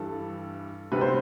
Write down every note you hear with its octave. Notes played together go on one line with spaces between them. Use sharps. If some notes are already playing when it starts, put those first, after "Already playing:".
Already playing: G2 E3 G3 A4
D2 C3 G3 B3 B4
C5